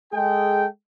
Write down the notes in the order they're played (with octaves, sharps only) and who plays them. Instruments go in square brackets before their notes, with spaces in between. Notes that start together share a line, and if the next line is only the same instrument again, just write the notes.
[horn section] G#3 G#4 A4 G5